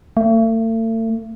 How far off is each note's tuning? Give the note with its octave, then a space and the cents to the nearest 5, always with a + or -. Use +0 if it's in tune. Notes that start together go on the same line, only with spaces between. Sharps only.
A3 +40